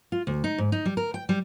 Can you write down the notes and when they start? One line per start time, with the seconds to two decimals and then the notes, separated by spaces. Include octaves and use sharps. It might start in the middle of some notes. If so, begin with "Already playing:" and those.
0.12 F4
0.27 D2
0.44 D#4
0.58 G#2
0.72 D#4
0.86 G3
0.97 A#4
1.14 G5
1.29 G3